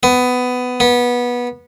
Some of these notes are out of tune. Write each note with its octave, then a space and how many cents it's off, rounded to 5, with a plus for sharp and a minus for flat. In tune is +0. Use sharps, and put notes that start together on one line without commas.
B3 +15
B3 -20